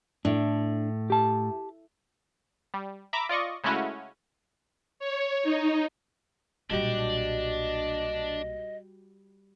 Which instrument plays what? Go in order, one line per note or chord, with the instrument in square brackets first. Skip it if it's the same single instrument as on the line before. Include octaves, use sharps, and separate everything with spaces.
[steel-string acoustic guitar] A2 [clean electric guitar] D4
[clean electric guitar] G4 A5
[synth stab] G3
E5 A#5 B5 D6
F4 D5 D#5 C#6
C#3 G#3 A3 C#4 E4 F#4
[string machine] C#5
D#4
[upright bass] B1 A#2 [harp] G3 F#4 G4 [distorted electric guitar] D4 D5 [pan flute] D#5